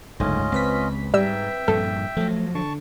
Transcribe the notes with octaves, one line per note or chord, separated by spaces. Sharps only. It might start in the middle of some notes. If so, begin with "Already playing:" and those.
F#1 D2 G#2 A3 C#4 F4 D#5
C#2 C4 B4 B6
G#2 G3 E5 G5 E6
G2 A#2 F3 A4
F3 F#3 A3
D3 A5 C#6